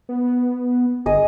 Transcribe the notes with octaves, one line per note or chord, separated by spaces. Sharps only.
B3
G1 G#4 D#5 D#6